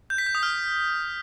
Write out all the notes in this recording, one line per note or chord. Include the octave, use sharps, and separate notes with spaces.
G6
B6
G6
D#6
F6